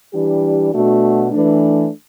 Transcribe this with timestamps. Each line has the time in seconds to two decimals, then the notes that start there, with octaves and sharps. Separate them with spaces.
0.13 E3 G3 D4 G4
0.72 B2 A3 D4 F#4
1.32 E3 A3 D4